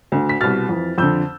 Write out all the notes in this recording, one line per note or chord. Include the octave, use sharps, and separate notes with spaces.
D2 D3
B6
C2 B2 F6 A6
F2 E3
F2 D3 E6 G6